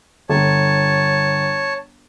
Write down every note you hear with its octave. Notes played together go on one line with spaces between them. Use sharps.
G1 C#5 A5